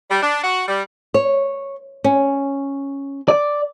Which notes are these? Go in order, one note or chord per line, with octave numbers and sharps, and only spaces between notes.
G3
D4
F#4
G3
C#5
C#4
D5